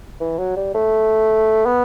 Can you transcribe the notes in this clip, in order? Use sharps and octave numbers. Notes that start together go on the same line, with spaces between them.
E3
F#3
G3
A3
B3